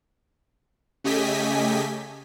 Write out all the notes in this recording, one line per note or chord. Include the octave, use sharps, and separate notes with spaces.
C#3 A3 G4 D#5 G#5 B6